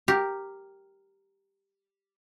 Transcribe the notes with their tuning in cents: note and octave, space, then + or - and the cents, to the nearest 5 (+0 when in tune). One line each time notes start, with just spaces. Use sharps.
G4 +0 A#4 +0